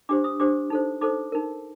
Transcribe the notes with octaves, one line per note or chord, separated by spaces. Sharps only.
D4 G4 C5 D6
D#6
D4 G4 C5 D6
D#4 A4 C5
D#4 A4 C5 D6
D#4 A#4